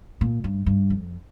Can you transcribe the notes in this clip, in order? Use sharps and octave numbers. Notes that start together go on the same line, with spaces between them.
A#2
G2
G2
F2